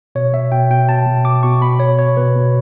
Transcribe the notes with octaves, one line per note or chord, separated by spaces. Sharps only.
B2 C#5
B2 E5
B2 G5
B2 G5
B2 A5
B2
B2 D6
B2 C#6
B2 B5
B2 C#5
B2 C#5
B2 B4
B2